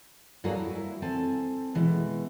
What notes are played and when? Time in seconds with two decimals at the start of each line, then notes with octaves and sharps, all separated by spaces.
0.44 G2 F#3 A#3 G#4 A4
0.58 E4
1.02 C4 A4 G#5 A5
1.75 B2 E3 G#3